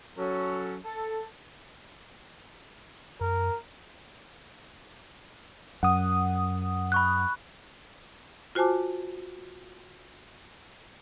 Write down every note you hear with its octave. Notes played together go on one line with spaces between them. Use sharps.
F#3 C#4 A4
A4
F#2 A#4
F#2 F#5 D#6
B5 C#6 F#6
F4 F#4 C5 G#5 A5 D6